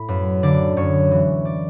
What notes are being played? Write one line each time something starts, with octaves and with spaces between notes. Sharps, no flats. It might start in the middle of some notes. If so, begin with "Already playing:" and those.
Already playing: A2 B5
F#2 B4
D3 D5
F#2 C#5
E3
D5